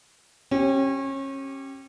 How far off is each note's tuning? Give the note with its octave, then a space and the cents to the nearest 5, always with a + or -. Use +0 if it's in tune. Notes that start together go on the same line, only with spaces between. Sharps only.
C#4 -30 G4 -5